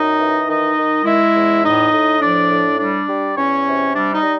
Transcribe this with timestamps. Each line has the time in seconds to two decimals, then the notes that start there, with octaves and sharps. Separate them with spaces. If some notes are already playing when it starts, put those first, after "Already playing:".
Already playing: F#2 D#4 D#5
0.19 E3
0.48 D#3 D#4 D#5
0.77 D#3
1.05 G#3 E4 E5
1.34 E2
1.63 A2 D#4 D#5
1.92 A2
2.20 F3 D4 D5
2.49 A2
2.78 G3 D4 D5
3.08 G3
3.36 E2 C#4 C#5
3.65 C3
3.94 G3 D4 D5
4.13 D#4 D#5
4.22 G3